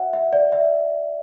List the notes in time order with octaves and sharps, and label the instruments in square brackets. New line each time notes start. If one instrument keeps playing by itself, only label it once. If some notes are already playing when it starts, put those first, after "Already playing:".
Already playing: [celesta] F#4 C#5 E5 F#5
E5
C#5 D5
E5